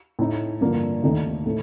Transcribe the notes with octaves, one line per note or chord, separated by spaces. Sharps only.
A2 A3 D#4
G2 D3 F3 A#3
D#2 D#3 A3 D#4
A2 A3